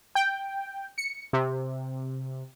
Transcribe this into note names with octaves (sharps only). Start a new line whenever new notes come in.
G5
C#7
C3